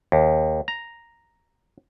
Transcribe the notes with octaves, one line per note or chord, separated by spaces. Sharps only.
D#2
A#5